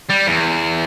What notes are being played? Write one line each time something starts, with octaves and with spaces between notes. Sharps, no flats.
G3
E2